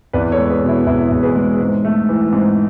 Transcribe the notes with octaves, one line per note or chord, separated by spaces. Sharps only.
E2 B4 D5
A4 C#5
G#3
G#4 B4
B2
E4
E2 E4
E2
G#4 B4
G#3
G#2
A3
E3
G#2